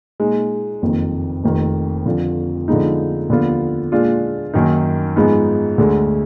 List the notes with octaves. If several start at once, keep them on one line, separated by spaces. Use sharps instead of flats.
A#2 G#3 D#4
F#1 F2 D#3
F1 F2 D#3
F2 D3 F3
D3 F3 G#3 B3 D#4
D#2 D3 F3 B3 F4
A#2 G#3 D4 F4
F#2 D#3 A#3 D#4
G#2 F3 G#3 B3 D#4
D2 D3 G#3